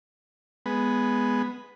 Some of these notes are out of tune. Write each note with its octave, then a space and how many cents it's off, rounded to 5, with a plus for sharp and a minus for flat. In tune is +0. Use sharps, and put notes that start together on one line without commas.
G#3 +0 B3 +0